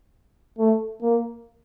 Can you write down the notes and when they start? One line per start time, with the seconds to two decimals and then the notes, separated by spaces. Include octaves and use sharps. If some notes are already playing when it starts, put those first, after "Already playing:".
0.59 A3
1.02 A#3